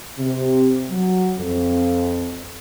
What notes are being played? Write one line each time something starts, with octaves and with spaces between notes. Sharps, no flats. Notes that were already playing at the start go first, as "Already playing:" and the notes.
C3
F#3
F2